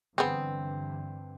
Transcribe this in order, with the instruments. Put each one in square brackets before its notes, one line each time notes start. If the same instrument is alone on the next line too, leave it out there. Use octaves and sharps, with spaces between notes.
[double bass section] G2 D3 E3 [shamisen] B3 G#4 [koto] C4